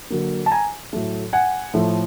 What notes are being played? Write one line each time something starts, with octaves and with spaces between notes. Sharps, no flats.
D3 F#3 A#3
A5
G#5 A#5
A2 F#3 A3
F#5 G#5
A2 F3 A3